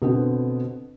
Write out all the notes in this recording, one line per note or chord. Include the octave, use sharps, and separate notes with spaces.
B2 D3 B3 C4